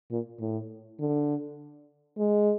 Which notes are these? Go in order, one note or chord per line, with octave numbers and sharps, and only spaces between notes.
A#2
A2
D3
G#3